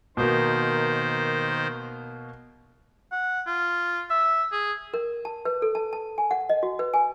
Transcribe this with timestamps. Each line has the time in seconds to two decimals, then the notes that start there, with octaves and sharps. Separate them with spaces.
0.17 B2 D#3 A#3 C5
3.12 F#5
3.47 F4
4.10 E5
4.52 G#4
4.94 A#4
5.25 A5
5.45 B4
5.62 A4
5.75 A5
5.93 A5
6.18 G#5
6.31 F#5
6.49 D#5
6.63 F#4
6.79 B4
6.94 G#5